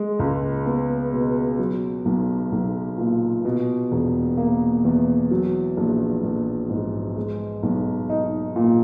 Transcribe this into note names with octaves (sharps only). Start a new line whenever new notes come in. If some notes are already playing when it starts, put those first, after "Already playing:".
Already playing: G#3
C#2
B3
B2
F#3
B1
B1
A#2
B2
E1
A#3
E2
F#3
A#1
A#1
G#2
G#3
B1
D#4
A#2